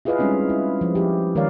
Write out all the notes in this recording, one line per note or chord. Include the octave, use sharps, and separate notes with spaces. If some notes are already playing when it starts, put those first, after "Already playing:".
E4 F4 G#4 B4 D#5 F5
G3 G#3 C4 C#4 D#4
E4
F3
F3 E4 G4
D#3 G#3 A#4 C#5 D5 F5